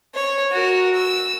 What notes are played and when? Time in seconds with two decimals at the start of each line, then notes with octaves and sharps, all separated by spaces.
0.15 C#5
0.51 F#4 A#4
0.94 E6